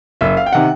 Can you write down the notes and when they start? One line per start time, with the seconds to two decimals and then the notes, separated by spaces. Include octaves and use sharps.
0.21 F#1 E5
0.37 F5
0.46 G5
0.53 C3 D#3 F#5